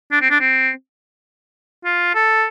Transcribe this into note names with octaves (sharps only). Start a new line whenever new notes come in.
D4
C4
D4
C4
F4
A4